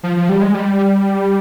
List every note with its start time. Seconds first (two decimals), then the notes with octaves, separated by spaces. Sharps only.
0.03 F3
0.17 F3
0.29 G3
0.42 G#3
0.54 G3